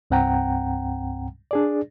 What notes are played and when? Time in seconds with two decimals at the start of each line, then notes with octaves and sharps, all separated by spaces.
0.11 C2 G2 C4 F#5 G5 A#5
1.51 D4 G#4 D5